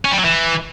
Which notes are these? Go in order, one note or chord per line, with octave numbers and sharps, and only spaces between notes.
C#4
G3
F#3
E3